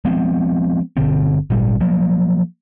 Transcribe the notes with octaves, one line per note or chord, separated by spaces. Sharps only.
F3 G#3 B3 C4
G1 B2 D3 C4
G#1 A#2 G3
F3 F#3 A#3